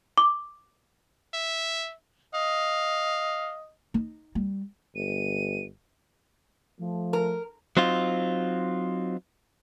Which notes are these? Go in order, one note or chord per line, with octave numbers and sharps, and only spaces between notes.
D6
E5
D#5 F5
D#4
G3
G1 D#7
F3 A3
A#4
F#3 C4 D#4 F4